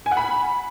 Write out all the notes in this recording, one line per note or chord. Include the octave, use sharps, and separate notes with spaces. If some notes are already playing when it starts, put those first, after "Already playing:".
G#5
F#5
B5